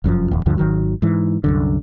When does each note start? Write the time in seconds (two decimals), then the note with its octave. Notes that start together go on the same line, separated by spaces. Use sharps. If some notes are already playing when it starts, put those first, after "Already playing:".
0.04 F1 F#2 C#3 F3
0.31 D1 E2
0.46 D2 G2 D3 F3
0.57 G#1 D#3 F#3
1.02 G#2 E3
1.44 C2 F#2 D3